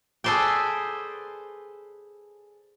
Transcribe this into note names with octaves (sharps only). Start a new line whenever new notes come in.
G#4 A4 B4 C5 D5 G5